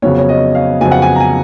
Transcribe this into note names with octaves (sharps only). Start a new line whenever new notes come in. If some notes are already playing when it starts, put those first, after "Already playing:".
F2 C#3 F#3 B3 C#5
C#5
D#5
F5
F2 C#3 F#3 B3 G#5
F#5
G#5
A#5
G#5